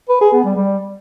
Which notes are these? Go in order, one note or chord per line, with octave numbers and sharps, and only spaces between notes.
B4
G#4
B3
G3
G3